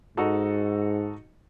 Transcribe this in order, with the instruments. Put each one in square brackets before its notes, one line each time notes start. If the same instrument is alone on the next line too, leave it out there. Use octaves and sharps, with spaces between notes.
[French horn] G#2 [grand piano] D#4 F#4 A4